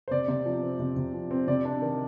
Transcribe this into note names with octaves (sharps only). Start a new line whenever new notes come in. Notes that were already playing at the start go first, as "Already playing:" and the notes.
C5
C3 D5
C3
F3
C4
C3
C3
F3
C4
C3 D5
D4
D#3